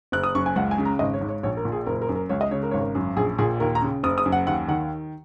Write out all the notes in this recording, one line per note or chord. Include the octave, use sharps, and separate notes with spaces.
F#1 F#6
D#6
F#2 C#6
G#5
C#2 F#5
G#5
C#3
A#5
G#1 D#5
C#5
G#2
C#5
A#1 C#5
A#4
A#2
G#4
F#1 A#4
A#4
F#2
A#4
C#2 C#5
D#5
C#3 C#5
A#4
G#1 C#5
A#4
F#2
A#1 G#4
A#2 G#4
D#2 A#4
A#5
C#3
F#1 D#6
D#6
F#2
F#5
D#2 F#5
D#3 F#5